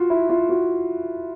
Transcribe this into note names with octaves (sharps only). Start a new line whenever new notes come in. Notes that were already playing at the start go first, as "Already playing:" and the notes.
Already playing: F4 F#4
E4
F4
F#4